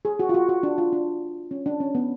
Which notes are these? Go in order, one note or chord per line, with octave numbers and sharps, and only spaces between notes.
G#4
F#4
F4
F#4
F#4
D4
F4
D4
C#4
D4
C#4
B3